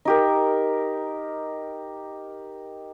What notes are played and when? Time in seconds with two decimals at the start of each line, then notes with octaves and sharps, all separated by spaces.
0.05 D#4 G4 A#4